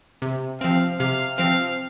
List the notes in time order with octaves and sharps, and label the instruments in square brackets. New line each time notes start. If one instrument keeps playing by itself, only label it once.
[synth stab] C3
[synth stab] F3 C4 [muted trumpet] F5
[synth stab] C3 [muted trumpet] F5
[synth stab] F3 C4 [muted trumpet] F5